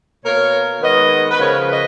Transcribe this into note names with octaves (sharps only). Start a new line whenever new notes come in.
B2 A#3 A#4 C#5
D#3 G#3 B3 B4 D#5
B4
C#3 F3 B3 A#4 C#5
B4 D#5